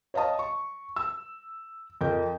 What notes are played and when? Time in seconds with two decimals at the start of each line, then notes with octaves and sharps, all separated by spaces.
0.14 C#5 D#5 F5 A5 D#6
0.39 C#6
0.96 E6
2.01 F2 A#4 D#5 G6